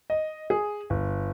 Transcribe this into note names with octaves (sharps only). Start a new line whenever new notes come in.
D#5
G#4
G1